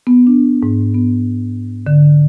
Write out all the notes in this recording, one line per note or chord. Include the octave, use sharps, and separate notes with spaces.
B3
D4
G#2
B3
D3